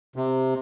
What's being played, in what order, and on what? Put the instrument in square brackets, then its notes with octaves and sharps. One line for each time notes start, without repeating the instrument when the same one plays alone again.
[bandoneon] C3